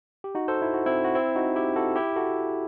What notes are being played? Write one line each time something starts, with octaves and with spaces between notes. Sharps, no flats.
G4
D#4 F#4
A4 C5
E4
F#4
C4 E4
F#4
C4 E4
D#4 F#4
E4 G4
F#4 A4
E4 G4
F#4 A4